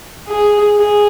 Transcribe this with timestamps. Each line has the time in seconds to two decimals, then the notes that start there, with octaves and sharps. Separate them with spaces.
0.27 G#4
0.79 G#4